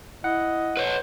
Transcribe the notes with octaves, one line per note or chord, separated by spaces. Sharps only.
E4 D#5 F#5
B4 C#5